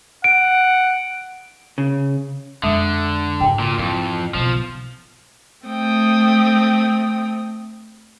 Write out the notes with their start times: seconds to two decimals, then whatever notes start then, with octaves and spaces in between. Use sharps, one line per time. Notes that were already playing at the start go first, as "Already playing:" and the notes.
0.24 F#5 D7
1.78 C#3
2.63 F2 D3 G#3 E5 D#6
3.41 G#2 C#3 G5
3.59 A#2
3.79 F2 E3
4.34 B1 C#3 F3
5.65 A3 C4 G5 D#6